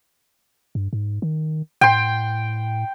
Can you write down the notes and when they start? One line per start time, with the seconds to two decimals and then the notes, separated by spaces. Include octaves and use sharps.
0.75 G2
0.93 G#2
1.22 D#3
1.81 A2 G5 C6